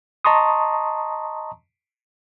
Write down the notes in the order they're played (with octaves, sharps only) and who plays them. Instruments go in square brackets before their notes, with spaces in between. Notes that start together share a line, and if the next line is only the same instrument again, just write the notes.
[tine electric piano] D#5 A5 A#5 C6 C#6 D#6